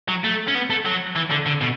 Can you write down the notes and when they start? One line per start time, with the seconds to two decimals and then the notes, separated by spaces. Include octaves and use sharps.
0.09 F#3
0.24 A3
0.48 C#4
0.55 B3
0.70 A3
0.85 F#3
1.16 E3
1.30 D3
1.46 D3
1.61 B2